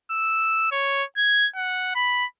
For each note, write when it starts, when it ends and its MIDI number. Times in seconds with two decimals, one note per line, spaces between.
0.11 0.67 88
0.72 1.04 73
1.17 1.47 92
1.56 1.94 78
1.95 2.25 83